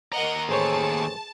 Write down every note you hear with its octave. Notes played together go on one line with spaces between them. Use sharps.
D#2 A#4 D#5 F#5 A#5
A1 G#4 C5 C#5 A5